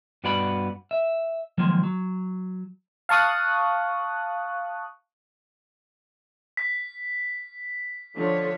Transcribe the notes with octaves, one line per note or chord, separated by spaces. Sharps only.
G2 B3 F#4 D5 F#5 B5
E5
D#3 F3 F#3 G#3 A#3
F#3
F5 A5 C#6 D#6 F#6
B6
D3 F3 C#5